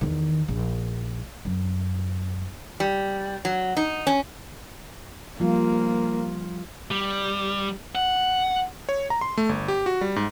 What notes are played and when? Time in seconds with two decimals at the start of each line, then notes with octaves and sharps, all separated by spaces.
0.01 E2 D#3
0.48 A#1
1.45 F#2
2.80 G3
3.45 F#3
3.77 D#4
4.07 C#4
5.40 F3 G3 A#3 F4
6.91 G3
7.95 F#5
8.89 C#5
9.10 A#5
9.21 C6
9.38 A3
9.49 G1
9.68 G4
9.86 F#4
10.01 G3
10.16 G#2